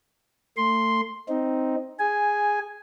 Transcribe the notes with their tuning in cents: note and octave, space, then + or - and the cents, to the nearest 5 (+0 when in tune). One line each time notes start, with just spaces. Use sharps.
A3 +35 C6 +0
C4 +0 D#4 +0
G#4 -10 G#5 +0